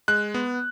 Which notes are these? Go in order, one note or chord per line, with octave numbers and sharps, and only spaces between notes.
G#3 F#6
B3